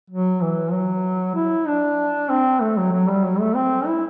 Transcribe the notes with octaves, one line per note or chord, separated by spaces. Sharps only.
F#3
E3
F#3
E4
D4
C4
A3
F#3
F#3
G3
F#3
A3
C4
E4